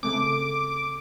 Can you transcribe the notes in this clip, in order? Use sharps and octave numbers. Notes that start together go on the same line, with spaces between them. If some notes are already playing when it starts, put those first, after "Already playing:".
C#3 A3 C4 D6